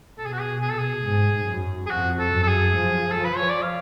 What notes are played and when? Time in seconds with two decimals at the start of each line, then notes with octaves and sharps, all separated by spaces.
0.18 B2 A4
0.26 G#4
0.33 F#4
0.41 G#4
0.61 G#4
0.70 A4
0.79 G#4
1.05 G#2
1.47 F#2
1.86 G#4
1.90 F2 F#4
2.19 A4
2.34 F#2
2.43 A4
2.47 G#4
2.77 F3
3.11 A4
3.24 B4
3.37 C#5
3.49 D5
3.62 F5